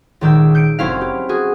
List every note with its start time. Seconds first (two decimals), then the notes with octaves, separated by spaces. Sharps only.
0.21 C#2 A#2 D#3 D6 E6 G6
0.55 G6 C#7 D7
0.79 F#1 C4 C#4 E4 F5
1.01 G4
1.29 F#4 G#4